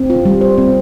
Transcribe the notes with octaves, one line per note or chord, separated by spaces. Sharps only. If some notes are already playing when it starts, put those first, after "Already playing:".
Already playing: C4
F4
G3
C5
C4